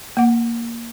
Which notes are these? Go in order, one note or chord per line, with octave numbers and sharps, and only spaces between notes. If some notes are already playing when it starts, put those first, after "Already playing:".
A#3 F#5